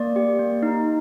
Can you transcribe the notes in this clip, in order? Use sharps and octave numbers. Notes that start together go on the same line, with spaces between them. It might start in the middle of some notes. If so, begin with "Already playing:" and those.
Already playing: A#3 D5
G4
A#3
D#4